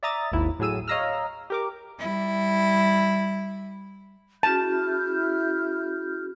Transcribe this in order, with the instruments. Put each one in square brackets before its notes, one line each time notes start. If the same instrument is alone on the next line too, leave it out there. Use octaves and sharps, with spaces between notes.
[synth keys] D5 E5 A#5 D#6 A6
G#1 D#2 E4
A2 F#3 G#4 E6 D#7
C#5 D#5 F5 A#5 E6 F6
G4 A#4 D6
[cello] G3 E4
[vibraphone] C#4 F#4 G#4 [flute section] E4 F6 G6 [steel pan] A5